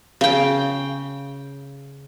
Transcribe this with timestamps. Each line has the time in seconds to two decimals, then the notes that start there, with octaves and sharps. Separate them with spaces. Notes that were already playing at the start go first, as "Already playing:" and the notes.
0.21 C#3 G5